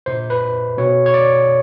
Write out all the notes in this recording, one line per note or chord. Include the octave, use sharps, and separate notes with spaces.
A#2 C5
B4
B2 C#5
C#5
D5